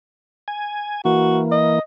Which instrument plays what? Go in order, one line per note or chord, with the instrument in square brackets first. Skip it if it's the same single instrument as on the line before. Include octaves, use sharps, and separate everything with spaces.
[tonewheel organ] G#5
[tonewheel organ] E3 A#3 [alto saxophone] F#4
[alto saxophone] D#5